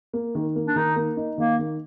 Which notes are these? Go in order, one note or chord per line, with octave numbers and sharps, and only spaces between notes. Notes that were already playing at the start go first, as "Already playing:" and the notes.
A#3
D#3
A#3
D4
D#3 D#4
A#3
D#4
D#3 A#3
D#3